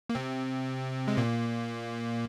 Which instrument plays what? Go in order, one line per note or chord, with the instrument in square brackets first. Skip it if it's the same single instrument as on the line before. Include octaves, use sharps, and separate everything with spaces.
[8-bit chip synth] A#3
C3 C4
G#3
A#2 A#3